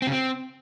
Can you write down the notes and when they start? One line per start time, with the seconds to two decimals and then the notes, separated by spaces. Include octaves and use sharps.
0.02 C4
0.07 C#3
0.12 C4